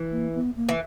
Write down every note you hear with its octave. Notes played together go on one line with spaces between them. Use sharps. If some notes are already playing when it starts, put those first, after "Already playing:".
Already playing: E3
A#3
B3
A#3
E3